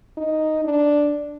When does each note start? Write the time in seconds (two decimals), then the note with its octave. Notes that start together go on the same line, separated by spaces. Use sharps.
0.17 D#4
0.64 D4